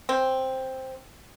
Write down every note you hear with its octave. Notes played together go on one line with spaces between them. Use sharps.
C4